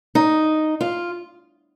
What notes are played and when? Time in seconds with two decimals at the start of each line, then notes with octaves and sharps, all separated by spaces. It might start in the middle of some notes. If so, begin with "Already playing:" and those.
0.15 D#4
0.81 F4